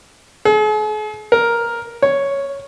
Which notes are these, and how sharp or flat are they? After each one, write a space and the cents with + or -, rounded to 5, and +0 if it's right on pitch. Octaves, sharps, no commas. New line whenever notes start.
G#4 +45
A#4 +5
C#5 +0